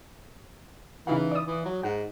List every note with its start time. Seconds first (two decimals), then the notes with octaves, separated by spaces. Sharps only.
1.07 C#3 E3 D#4 F5
1.31 D5 D#6
1.47 E3
1.65 F#3
1.83 G#2 F#5